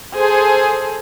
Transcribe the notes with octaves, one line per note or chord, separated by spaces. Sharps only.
G#4 A4 C5